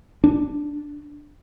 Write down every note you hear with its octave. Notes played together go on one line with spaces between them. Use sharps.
D4